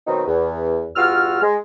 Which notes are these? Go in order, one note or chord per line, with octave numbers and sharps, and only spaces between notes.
B2 D#3 F#3 C4 D#4
E2
E2 G2 F4 F#4 E6 F6
G#3